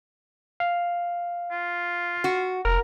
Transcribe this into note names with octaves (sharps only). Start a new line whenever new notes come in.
F5
F4
F#4
F1 A#4 A#5